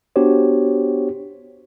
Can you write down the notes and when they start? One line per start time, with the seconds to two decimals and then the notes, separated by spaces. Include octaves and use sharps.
0.16 B3 D4 F#4 G4 C5 C#5